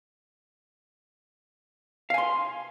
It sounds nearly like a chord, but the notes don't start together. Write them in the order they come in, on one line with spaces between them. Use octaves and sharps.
F5 G#5 C6